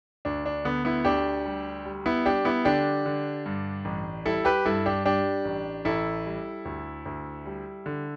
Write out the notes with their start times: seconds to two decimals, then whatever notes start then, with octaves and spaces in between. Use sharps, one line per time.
0.25 D2 D4
0.46 D4
0.65 D3 B3
0.85 B3 E4
1.05 D2 D4 G4
1.46 G3
1.85 G3
2.06 B3 E4
2.25 G3 D4 G4
2.45 B3 E4
2.65 D3 D4 G4
3.06 D3
3.46 G2
3.85 A1
4.25 G3 E4 A4
4.45 G4 B4
4.65 G2 E4 A4
4.86 D4 G4
5.05 G3 D4 G4
5.45 A1
5.85 A1 E4 A4
6.26 G3
6.65 D2
7.05 D2
7.46 G3
7.86 D3